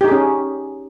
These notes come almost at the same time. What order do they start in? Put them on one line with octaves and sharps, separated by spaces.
G4 D#4 G#4 C#4